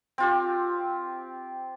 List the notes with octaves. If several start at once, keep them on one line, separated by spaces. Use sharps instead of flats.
C4 F4 G4